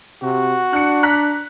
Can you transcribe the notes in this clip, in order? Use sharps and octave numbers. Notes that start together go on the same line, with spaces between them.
C3 F#4
D4 F#6 C#7
A#5 F#6 B6